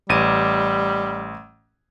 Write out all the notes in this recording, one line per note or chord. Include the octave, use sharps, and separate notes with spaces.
A1 G3 D#7